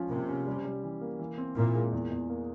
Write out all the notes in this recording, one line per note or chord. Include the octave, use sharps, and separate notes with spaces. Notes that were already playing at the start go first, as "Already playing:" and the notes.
Already playing: F3 G#3 C#4
C3 A#3
C#4
G3
G3
E3
A#3
E3
C4
A#2 E4
G#3
E2
E2
A#3